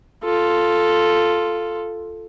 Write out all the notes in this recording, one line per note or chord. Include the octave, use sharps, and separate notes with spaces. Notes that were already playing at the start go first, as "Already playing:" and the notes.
F4 A4